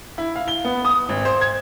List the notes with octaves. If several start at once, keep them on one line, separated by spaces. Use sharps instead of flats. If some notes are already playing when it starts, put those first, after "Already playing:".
E4
F5
G7
B3
D#6
G#1
C5
G#6